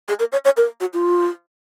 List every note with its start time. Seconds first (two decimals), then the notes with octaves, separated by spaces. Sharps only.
0.08 G#4
0.20 A#4
0.32 C#5
0.45 C#5
0.57 A#4
0.81 F#4
0.93 F4